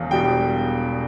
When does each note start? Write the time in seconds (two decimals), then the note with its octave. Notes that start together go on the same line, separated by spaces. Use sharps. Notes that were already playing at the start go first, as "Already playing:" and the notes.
Already playing: E1 E2 B2 F5
0.10 E1 E2 B2 G3 G5